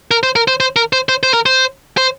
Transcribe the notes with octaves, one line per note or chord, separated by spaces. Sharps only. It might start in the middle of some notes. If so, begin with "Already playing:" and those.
A#4
C5
A#4
C5
C5
A#4
C5
C5
C5
A#4
C5
C5